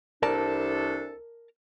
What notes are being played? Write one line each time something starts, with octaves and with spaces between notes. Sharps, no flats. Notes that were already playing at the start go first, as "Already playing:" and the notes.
C2 D4 A4 A#4 D5 A5